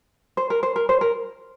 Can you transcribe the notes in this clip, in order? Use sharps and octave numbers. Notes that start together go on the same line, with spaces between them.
C5
A#4
C5
A#4
C5
A#4